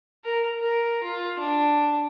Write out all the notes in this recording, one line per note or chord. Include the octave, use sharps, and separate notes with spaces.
A#4
A#4
F4
D4